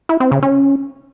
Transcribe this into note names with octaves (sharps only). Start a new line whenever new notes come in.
E4
C4
C#3
C#4